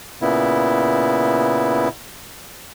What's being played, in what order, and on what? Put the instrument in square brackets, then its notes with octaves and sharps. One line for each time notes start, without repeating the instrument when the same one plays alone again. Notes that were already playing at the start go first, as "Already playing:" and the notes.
[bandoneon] A#2 C#3 B3 E4